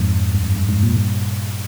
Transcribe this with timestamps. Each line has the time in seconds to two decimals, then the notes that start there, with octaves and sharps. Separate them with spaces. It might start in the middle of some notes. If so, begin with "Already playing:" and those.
Already playing: F2 G#2
0.35 G2
0.43 F2
0.56 G2
0.69 F2 G#2
0.83 G2 A#2
0.96 G2 A#2